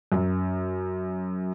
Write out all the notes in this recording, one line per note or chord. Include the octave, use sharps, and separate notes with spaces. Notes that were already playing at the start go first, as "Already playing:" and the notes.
F#2